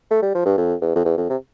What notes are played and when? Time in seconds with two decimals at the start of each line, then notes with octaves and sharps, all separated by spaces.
0.11 A3
0.22 G3
0.35 F3
0.46 G2
0.58 F2
0.81 E2
0.96 F2
1.05 E2
1.18 F2
1.29 C3